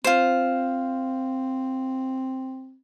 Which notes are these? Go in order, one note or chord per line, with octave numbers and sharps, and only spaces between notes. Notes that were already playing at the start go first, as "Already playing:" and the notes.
C4 F4 C5